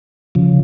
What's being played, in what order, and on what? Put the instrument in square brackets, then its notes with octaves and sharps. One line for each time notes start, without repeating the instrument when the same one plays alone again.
[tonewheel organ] C#3 F3